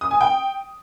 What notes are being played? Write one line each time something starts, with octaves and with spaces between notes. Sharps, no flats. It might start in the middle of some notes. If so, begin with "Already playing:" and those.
D#6
G#5
G5